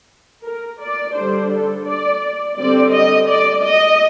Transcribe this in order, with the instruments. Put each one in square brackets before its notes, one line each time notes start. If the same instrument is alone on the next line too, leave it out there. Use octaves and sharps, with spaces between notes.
[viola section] A#4
D5
D3 G3 D4 C5
A4
D5
D3 G3 C4 D5
D#5
D5
D#5